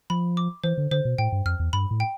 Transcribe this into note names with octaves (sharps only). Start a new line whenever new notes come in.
F3 B5
D6
E3 C5
D3
D3 C5
B2
A2 G5
G2
F2 F6
E2
G2 B5
A2
G5